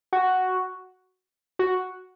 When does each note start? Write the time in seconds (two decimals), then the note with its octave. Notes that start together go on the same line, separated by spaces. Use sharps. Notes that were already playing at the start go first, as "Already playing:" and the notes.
0.13 F#4
1.59 F#4